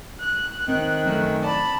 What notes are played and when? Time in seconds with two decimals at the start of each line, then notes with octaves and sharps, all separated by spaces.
0.20 F#6
0.68 D#3 C4
1.06 F#2 A3
1.43 D5 A5 B5